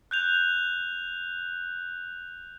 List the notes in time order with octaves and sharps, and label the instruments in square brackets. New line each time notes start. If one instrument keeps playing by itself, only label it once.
[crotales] F#6 G6 F7